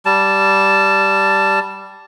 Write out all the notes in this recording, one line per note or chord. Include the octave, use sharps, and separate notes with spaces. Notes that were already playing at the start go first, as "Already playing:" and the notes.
G3 A5